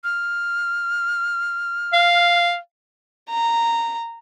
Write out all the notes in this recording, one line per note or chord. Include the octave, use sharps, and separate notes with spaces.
F6
F5
A#5